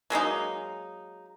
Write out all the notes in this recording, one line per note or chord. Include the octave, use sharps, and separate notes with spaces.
F#3 G#3 A#3 D#4